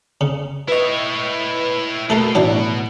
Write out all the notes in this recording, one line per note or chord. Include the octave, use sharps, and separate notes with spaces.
C#3
E4 B4 C#5 D#5
B2 A3 A4 A#4 C7
A2 E3 F#3 D4 E4